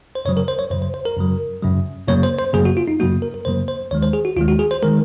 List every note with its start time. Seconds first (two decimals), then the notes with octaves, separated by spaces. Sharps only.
0.15 C5
0.25 F#2 C#3 F#3 C#5
0.37 A#4
0.48 C5
0.59 C#5
0.71 F#2 C#3 F#3 C5
0.82 C5
0.94 C5
1.06 A#4
1.17 F#2 C#3 F#3
1.63 F#2 C#3 F#3
2.08 F#2 C#3 F#3 A#3 C#5
2.23 C5
2.39 C5
2.53 F#2 C#3 F#3 A#3 G#4
2.65 F#4
2.77 F4
2.88 D#4
3.00 F#2 C#3 F#3 A#3 F#4
3.22 A#4
3.34 A#4
3.45 F#2 C#3 F#3 A#3 C5
3.68 C5
3.91 D#2 D#3 G#3 C#5
4.03 C5
4.13 G#4
4.25 F#4
4.37 D#2 D#3 G#3 F4
4.48 F#4
4.59 G#4
4.71 C5
4.82 D#3 G#3 A#4